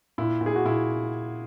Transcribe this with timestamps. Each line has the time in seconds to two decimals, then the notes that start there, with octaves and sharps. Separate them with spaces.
0.18 A#2 E4
0.41 A#2
0.46 G#4
0.56 F#4
0.65 A#2 E4